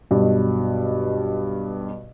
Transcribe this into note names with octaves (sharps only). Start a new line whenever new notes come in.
B1 G2 B2